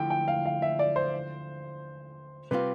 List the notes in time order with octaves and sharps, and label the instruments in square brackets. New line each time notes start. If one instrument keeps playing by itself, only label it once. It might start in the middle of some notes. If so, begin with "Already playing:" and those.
Already playing: [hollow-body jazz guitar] D3 F3 A3 E4 [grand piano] G5
[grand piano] G5
F5
F5
E5
D5
C5
[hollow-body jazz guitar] C3 G3 C4 F4 [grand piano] B4